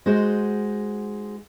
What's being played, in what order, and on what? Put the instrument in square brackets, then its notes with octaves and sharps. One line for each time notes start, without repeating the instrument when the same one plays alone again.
[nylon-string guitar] G#3 D#4 F#4 C5